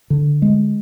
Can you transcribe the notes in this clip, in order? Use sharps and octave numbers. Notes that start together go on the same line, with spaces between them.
D3
G#3